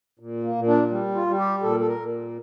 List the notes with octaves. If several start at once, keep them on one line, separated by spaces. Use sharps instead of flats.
A#2
A#3
A#2
D4
G3
F4
G3
G4
A#2 A4
A4
A#4
A#2